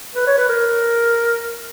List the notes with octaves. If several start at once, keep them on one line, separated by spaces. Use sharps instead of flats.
B4
C#5
B4
A#4